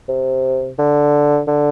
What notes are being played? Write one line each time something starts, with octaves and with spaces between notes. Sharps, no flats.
C3
D3
D3